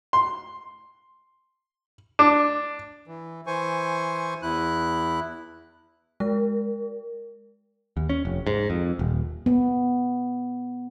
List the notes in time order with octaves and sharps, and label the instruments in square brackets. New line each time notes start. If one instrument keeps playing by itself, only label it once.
[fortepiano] C6
D4
[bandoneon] E3
E3 C5 G#5 C#6
E2 E4 F#6
[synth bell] G#3 [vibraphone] A#4
[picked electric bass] D#2
C#4
F1
G#2
F2
D#1
[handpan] B3